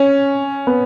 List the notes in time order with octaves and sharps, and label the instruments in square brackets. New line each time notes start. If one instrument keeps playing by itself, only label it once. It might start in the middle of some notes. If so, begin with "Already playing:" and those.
Already playing: [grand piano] C#4
B3